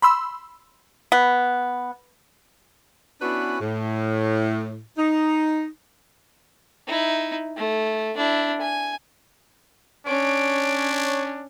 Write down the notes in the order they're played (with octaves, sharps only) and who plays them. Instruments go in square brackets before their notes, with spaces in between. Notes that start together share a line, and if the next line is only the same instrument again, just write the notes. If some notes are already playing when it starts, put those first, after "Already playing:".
[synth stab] B5 C6 E6
[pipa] B3
[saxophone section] B3 C#4 D4 E4 F#4 B4
A2
D#4
[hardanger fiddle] D#4 E4
A3
D4 E4
G#5
[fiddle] C#4 [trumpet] D4 [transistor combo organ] C#5 [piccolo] D7